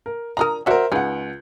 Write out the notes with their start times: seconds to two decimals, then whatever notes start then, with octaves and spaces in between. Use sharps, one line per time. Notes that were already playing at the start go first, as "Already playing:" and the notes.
0.06 A#4
0.37 F3 D4 A#4 A#5 D#6
0.66 F#3 F#4 A#4 C5 D5 E5
0.92 C#2 D#4 G#4 F#5